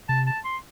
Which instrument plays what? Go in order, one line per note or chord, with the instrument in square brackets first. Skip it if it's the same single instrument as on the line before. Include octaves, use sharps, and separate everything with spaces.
[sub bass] C3 [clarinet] A5
[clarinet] A5
C6